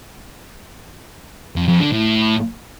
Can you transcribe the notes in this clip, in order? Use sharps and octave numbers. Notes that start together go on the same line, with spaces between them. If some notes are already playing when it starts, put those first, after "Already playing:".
F2
F2
D3
A2